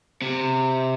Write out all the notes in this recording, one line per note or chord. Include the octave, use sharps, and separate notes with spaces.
C3